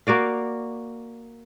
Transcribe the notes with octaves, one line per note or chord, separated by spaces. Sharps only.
A#3 F#4 D5 F5